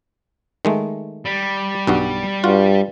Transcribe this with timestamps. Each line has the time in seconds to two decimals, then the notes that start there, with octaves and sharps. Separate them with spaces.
0.65 D#3 G#3 A3
1.25 G3
1.87 B1 G2 F#4
2.44 G2 F4 F#4